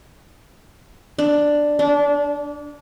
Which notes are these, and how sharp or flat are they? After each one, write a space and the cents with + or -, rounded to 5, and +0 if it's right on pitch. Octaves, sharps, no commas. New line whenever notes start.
D4 +5
D4 -25